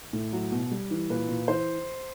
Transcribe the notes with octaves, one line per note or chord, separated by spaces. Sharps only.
A2
F#3
B2
G3
E3
A#2 B4
A#2
E3 C5